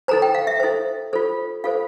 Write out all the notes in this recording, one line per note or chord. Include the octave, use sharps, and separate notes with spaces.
E4 A4 C5 A#5
G5
F5
E5
E4 A4 C5
F4 A4 C5
F4 A4 C5 F5